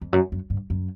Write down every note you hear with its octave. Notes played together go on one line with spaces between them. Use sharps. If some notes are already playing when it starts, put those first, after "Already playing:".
F2
F#2
F#2
G2
F#2